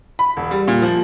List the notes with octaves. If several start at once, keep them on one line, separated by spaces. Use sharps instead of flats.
B5
E1
G3
A#2
F3